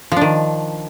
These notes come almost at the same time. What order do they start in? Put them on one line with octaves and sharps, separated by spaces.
F3 D4 D#3